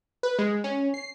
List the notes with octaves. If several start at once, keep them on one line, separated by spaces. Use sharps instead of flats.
B4
G#3
C#4
C7